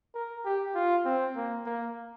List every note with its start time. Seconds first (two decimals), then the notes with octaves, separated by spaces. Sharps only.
0.15 A#4
0.45 G4
0.75 F4
1.05 C4
1.36 A#3
1.66 A#3